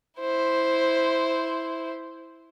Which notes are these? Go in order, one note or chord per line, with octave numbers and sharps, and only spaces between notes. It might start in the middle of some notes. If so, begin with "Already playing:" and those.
E4 C5